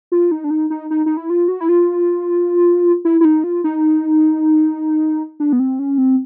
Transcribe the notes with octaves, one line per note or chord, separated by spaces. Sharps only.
F4
D#4
D4
D#4
D#4
D#4
D#4
E4
F4
F#4
E4
F4
E4
E4
D#4
F4
D#4
D4
B3
C4
C#4
C4